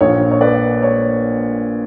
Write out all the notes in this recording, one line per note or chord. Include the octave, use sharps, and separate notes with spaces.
A#1 A#2 A#3 C#5
C#5
B4 D5
C#5